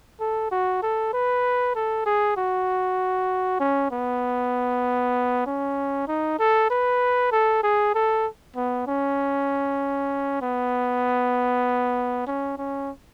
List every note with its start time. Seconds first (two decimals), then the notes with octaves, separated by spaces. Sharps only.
0.20 A4
0.51 F#4
0.82 A4
1.13 B4
1.75 A4
2.06 G#4
2.37 F#4
3.60 C#4
3.91 B3
5.46 C#4
6.08 D#4
6.39 A4
6.70 B4
7.32 A4
7.63 G#4
7.94 A4
8.56 B3
8.87 C#4
10.42 B3
12.27 C#4
12.58 C#4